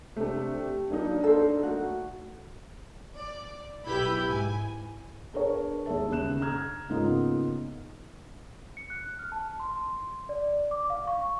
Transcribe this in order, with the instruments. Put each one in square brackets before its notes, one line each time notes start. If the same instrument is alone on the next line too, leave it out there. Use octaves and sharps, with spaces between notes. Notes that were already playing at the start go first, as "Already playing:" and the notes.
[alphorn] C3 [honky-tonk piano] A3 D4
[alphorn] G4
[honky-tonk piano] F#3 A#3 D#4 [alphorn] D4
[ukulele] A4 C5
[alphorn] A3 [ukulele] F#4
[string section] D5
B1 E4 G4 B4 B5 G6
G#2 G#5
[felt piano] D4 G#4 A#4 B4 C#5
D#2 G#4 C#5 E5 A5
D#2 C#3 F#6 E7
A#5 F6 G#6
G#2 C#3 A#3 B3 D#4 F4
[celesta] C#7
F#6
F6
A5
C6
D5
D6
F5
C#6